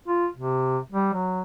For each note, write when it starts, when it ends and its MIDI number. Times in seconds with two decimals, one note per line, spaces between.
0.08 0.27 65
0.36 0.78 48
0.92 1.10 55
1.13 1.41 54